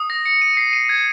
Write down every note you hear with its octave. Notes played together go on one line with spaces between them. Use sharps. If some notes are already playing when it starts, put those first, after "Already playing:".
Already playing: D#6
A#6
C#7
D#7
C7
D#7
G#6